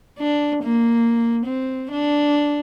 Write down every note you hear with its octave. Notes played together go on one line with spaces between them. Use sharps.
D4
A#3
C4
D4